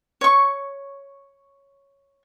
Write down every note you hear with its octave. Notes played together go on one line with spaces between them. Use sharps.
C#5 C#6